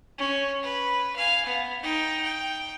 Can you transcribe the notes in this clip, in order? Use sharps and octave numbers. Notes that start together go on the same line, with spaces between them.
C#4
B4
F5 G#5
B3
D#4 G5
G5